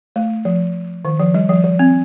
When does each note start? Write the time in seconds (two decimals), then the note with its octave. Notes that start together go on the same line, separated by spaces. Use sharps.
0.16 A3
0.45 F3
1.05 D#3
1.20 F3
1.34 G3
1.49 F3
1.64 F3
1.79 C4